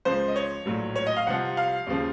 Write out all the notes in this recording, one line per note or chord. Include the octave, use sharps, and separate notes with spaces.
C#2 C#3 F3 C5
D#5
C#5
A#1 A2 F#3
C#5
D#5
F5
C2 C3 F3 F#5
F5
D#2 C#3 F3